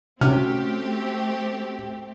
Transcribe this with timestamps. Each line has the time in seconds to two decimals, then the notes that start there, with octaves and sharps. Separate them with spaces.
0.21 C3 A3 C4 C#4 F#4 G4 F6